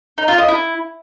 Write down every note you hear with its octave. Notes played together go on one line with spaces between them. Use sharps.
D#4
F4
D#5
E4